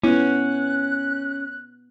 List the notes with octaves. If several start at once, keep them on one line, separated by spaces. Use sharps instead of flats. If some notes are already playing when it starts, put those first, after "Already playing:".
B3 C#4 E4 F#6